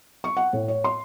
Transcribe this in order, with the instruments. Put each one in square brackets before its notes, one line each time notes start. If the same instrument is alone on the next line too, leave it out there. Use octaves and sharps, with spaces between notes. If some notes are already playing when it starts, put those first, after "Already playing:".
[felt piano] C#6
F#5
A2
C#5
C6